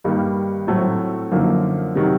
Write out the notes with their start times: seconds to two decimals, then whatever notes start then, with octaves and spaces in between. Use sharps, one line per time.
0.04 G2 D#3 G3 A#3
0.67 A2 F#3 A3 C4
1.31 F#2 D3 F3 A#3 D#4
1.95 C3 D#3 F#3